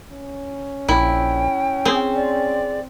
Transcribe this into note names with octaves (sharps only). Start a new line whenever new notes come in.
C#4
A#1 E4 G5
C4 G#4
D5